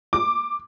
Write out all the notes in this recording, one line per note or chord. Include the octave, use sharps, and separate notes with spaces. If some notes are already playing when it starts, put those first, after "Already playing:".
D6